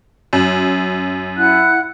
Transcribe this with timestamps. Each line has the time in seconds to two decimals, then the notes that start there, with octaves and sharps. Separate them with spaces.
0.33 F#2
1.37 E4 F#5 F#6